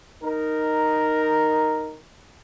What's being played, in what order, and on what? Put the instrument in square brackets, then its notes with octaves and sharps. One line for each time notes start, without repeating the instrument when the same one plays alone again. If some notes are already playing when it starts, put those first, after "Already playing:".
[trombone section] D#4 A#4